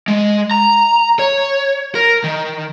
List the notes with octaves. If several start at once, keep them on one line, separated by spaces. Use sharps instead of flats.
G#3
A#5
C#5
A#4
D#3